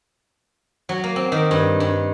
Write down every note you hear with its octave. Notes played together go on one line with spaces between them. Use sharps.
F#3
A#3
C4
D#3
G2
G2